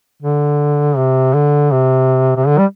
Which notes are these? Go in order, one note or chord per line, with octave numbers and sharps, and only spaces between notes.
D3
C3
D3
C3
C3
D3
G3